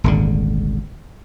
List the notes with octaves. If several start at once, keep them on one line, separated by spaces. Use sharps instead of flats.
D#1 G#1 D3